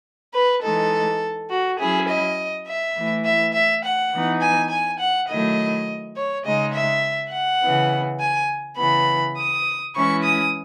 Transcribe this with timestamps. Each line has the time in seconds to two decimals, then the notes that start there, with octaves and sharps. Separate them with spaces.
0.34 B4
0.62 E3 G#3 D#4 A4
1.50 F#4
1.78 F#3 C#4 E4 G#4
2.08 D#5
2.67 E5
2.95 E3 A3 E4
3.24 E5
3.53 E5
3.83 F#5
4.12 E3 B3 D#4
4.41 G#5
4.70 G#5
4.99 F#5
5.28 D#3 F#3 A3 E4 D#5
6.16 C#5
6.45 C#3 G#3 D#4 D#5
6.73 E5
7.32 F#5
7.62 C#3 E3 B3
8.20 G#5
8.77 C#3 E3 B3 B5
9.37 D#6
9.95 E3 G#3 C#4 E4 C#6
10.23 D#6